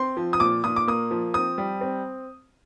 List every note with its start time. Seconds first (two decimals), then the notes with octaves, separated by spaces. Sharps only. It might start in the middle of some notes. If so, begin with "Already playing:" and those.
Already playing: C4 C6
0.17 F3
0.33 D#6
0.40 A#2 D6
0.64 A#2 D#6
0.76 D6
0.87 A#3 D#6
1.11 F3
1.34 C4 D#6
1.58 G3
1.81 C4